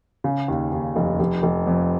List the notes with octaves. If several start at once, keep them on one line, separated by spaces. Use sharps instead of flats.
C#3
D#2
D#2
F1
F1
F1
F2